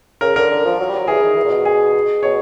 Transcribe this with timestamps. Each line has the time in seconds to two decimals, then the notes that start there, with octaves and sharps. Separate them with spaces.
0.21 C#3 A#4
0.36 D3 A#4
0.51 D3
0.65 F3
0.79 F#3
0.89 G3
0.98 F#3
1.08 E3 G#4
1.22 D#3
1.36 E3
1.45 A#2
1.51 B2
1.65 G#4
2.23 B2 C#5